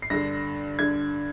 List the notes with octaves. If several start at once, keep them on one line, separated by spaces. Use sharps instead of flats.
C7
G2 D3 A#6
G2 D3 G#6